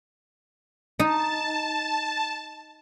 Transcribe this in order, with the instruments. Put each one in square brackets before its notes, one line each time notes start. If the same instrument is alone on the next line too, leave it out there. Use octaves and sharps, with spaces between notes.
[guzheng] D#4 [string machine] A5